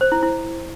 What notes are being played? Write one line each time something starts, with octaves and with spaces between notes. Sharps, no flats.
C5
E4
E4